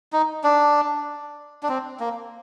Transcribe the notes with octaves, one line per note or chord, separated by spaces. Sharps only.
D#4
D4
D4
C4
A#3